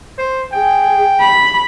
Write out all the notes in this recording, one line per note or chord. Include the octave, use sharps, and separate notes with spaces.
C5
G#4 G5
B5